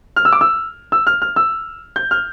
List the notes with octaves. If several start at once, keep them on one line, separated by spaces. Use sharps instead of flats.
F6
E6
D6
E6
E6
F6
F6
E6
G6
F6